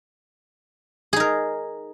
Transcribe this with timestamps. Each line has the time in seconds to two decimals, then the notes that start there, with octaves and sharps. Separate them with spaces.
1.13 G#4
1.16 D#4
1.20 A#4